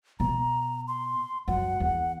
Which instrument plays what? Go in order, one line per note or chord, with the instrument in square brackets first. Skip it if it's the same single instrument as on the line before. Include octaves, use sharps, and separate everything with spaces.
[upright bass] B2 [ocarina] A#5
[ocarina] C6
[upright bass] F#2 [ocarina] F#5
[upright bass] E2